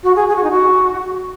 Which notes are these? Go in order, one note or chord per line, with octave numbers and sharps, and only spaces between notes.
F#4
G#4
G#4
F#4
D#4
F#4